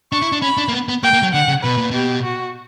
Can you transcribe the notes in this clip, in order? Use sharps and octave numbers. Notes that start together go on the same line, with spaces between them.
D4 C#6
E4
D4
C#4 B5
D4
A#3
B3
B3
A#3 G5
A#3
F#3
D3 F#5
C#3
B2 B4
A#2
B2 G4
F#4